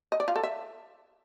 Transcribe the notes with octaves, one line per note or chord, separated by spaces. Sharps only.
D#5
D5
F4
A4
E5